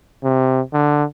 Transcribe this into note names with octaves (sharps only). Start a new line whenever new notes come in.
C3
D3